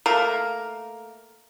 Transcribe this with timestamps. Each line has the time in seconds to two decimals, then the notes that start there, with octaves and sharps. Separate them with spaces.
0.06 A3 A#3 A#4